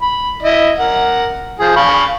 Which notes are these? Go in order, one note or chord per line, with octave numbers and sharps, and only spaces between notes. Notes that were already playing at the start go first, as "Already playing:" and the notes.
B5
E4 D#5
A#4 F#5
F3 G#4
F5 B5 C#6